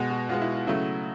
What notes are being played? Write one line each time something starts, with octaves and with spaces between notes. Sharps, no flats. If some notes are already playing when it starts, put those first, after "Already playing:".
Already playing: B2 G#3 B3
F#4
B2 G#3 B3 F4
E4
F4
C#3 F#3 A3 E4